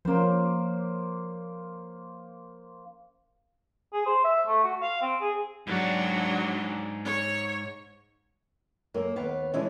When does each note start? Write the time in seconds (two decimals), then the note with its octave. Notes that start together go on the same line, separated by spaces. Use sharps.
0.05 F3 A#3 C#4 C5
3.93 G#4
4.06 C5
4.24 E5
4.47 A3
4.64 F#4
4.82 F5
5.01 C4
5.21 G#4
5.67 G#2 F#3 D4 D5
7.05 C#5
8.94 F#2 A#3
9.16 D#2 B3 F5
9.54 E3 G#3 C#4 D4